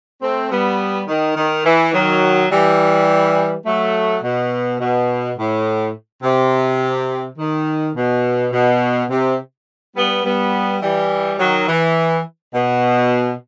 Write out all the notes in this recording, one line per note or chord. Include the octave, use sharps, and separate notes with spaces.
A3 C4
G3 B3
D#3
D#3
E3
D#3 F#3
E3 G3
F#3 A3
B2
B2
A2
C3
D#3
B2
B2
C3
G3 B3
G3 B3
E3 G3
D#3 F#3
E3
B2